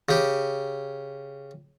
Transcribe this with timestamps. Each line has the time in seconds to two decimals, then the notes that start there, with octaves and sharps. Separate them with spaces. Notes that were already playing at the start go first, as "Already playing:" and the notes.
0.09 C#3 G4